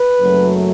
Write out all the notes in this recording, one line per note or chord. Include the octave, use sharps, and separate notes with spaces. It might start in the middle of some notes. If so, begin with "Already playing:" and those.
Already playing: B4
F#1 F#2 F#3 A3